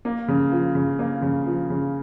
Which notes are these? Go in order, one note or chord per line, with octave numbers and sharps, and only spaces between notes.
A#3
C#3
F3
C#3
A#3
C#3
F3
C#3